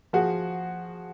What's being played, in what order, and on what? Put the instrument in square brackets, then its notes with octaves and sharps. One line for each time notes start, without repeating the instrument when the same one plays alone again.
[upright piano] F3 F#4 G#4